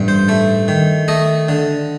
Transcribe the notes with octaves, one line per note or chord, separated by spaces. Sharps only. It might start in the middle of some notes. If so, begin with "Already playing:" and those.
Already playing: A1 G2
C5
A3
D#3
A3 D#5
D3